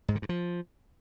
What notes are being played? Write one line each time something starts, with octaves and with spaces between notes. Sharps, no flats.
G#2
D3
G2
F3